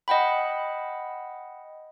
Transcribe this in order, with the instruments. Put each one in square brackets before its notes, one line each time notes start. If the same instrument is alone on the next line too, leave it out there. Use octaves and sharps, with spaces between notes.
[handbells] D#5 F#5 G5 B5